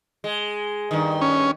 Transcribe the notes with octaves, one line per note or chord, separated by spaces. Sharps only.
G#3
G2 D#3
C#4